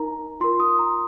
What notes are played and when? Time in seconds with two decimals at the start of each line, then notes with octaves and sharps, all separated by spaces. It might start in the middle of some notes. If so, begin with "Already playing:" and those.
Already playing: D#4 A#4 A#5
0.40 F4 A#4 C6
0.60 D#6
0.79 A#5